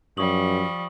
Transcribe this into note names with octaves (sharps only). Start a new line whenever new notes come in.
F#2 F3 G3 C#6 D#6 F#7